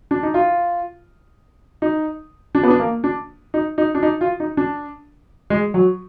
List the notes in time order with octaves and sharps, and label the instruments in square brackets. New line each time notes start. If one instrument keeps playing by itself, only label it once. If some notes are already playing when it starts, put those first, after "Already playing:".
[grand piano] D4
D#4
F4
D#4
D4
B3
D4
A#3
D4
D#4
D#4
D4
D#4
F4
D#4
D4
G#3
F#3